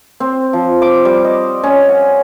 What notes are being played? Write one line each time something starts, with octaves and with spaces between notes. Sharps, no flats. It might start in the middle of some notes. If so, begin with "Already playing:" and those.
C4
F3
D6
G3
D#5
C#4
F#5